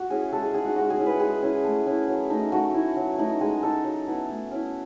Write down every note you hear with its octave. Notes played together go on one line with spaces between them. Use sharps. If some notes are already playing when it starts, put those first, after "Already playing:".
Already playing: F#4
C#4 E4 G#4
G#3 A4
G#4
D#4 G#4
F#4
G#3 F#4
G#4
C#4 E4
B4
G#3 G#4
C#4 E4
A3
C#4 E4
F#3
A3 D#4
A3 F#4
E4
F#3
A3 D#4
G#3 G#4
D#4 A4
F#3
B3 E4
A3
C#4 E4